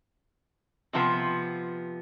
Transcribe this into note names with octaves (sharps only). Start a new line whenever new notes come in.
C3 F3 B3